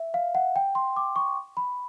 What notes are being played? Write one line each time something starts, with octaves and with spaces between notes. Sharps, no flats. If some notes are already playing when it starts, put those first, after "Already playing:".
Already playing: E5
F5
F#5
G5
C6
D6
C#6
B5